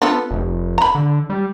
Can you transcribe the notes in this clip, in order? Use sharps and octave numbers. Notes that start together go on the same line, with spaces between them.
B3 D4 F4 A4
F1
A#5 B5
D3
G3